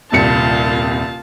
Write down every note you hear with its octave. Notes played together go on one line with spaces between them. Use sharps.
D#1 C2 F4 A5 C#7